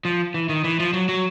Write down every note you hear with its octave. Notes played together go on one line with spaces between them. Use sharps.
F3
E3
D#3
E3
F3
F#3
F#3